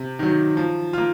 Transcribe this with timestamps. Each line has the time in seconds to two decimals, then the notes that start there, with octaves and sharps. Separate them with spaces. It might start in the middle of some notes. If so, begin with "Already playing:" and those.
Already playing: C3
0.19 D#3 F#3
0.57 F3
0.93 A#3 F4